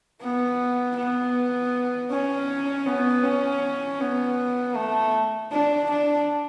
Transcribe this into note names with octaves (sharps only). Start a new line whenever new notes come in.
B3
B3
C#4
B3
C#4
B3
A3
D4
D4